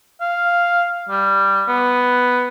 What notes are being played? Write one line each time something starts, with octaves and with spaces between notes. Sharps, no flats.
F5
G3
B3